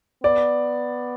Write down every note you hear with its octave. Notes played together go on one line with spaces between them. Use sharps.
B3 D5